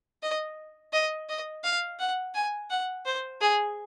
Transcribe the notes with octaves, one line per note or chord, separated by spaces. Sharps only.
D#5
D#5
D#5
F5
F#5
G#5
F#5
C5
G#4